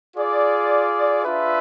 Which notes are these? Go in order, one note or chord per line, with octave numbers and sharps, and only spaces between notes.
F4 G#4 D5
D4 F4 B4 E5